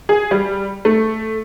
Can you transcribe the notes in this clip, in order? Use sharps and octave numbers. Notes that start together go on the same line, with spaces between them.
G#4
G3
A3